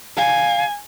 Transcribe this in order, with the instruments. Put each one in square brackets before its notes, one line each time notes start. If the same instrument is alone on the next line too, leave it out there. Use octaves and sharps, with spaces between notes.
[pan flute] F5 [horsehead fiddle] G#5